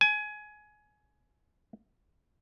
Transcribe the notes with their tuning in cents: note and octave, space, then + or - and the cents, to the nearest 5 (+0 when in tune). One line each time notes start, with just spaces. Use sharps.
G#5 +20